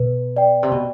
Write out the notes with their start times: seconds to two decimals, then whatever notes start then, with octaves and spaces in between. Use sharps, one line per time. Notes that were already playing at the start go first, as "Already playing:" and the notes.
Already playing: B2 B4
0.36 D5 G5
0.63 C3
0.71 B2